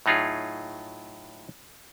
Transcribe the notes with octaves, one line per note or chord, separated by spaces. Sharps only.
A2 F#3 D#4 F4 G#4